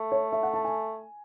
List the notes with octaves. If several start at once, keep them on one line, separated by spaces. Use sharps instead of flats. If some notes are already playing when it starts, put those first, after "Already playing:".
Already playing: A3
C#5
E5
F#5
A5
G#5